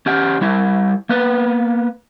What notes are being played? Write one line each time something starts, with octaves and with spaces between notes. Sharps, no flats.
C#4 G4 F#5
G3 E4
A#3 B3 B4